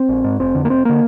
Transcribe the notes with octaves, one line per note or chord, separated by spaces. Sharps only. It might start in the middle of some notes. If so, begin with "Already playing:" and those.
Already playing: C4
A#1
G#2
F1 C4
F2 D3
A#3
F1 C4
D3 A#3